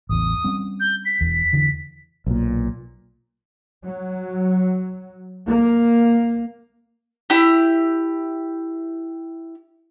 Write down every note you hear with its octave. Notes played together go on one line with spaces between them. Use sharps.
A1 E2 D#6
G3 C4 C#4
G6
B6
E1 E2
E2 D3 E3
B1 A#2
F#3
A#3
E4 G4